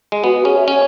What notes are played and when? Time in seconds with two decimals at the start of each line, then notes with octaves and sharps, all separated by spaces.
0.12 G#3
0.23 B3 F#4
0.35 F#4
0.45 C#4 G#4
0.57 E5
0.67 C#4 C#5